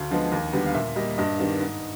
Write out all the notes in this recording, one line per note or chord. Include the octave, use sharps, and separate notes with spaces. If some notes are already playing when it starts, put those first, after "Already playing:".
Already playing: D2 F5
D3 F3 G#3 B3
D#2
D3 G3 B3
F5
A#2 E5
G3 A#3 D#5
G2 D#5
D#3 G3 B3
G#2